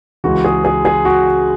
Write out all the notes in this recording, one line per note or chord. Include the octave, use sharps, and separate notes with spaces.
C#2 C#3 E3 F#4
G#4
G#4
G#4
F#4